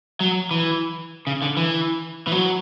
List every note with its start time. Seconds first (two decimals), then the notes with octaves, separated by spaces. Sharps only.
0.20 F#3
0.51 E3
1.27 C#3
1.42 D3
1.57 E3
2.27 E3
2.32 F#3